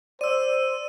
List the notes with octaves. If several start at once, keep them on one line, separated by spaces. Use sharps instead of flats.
C5 D5 E6 D#7